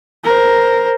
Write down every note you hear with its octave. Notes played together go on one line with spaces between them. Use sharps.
A#4 C5